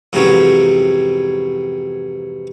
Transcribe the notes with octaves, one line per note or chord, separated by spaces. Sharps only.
F2 G#2 C3 E3 F#3 C#4